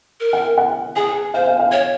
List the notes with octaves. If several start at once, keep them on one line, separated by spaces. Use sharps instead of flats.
A#4
F#5
F#5
G#4 G#5
C5 F5
F5
F5
C#5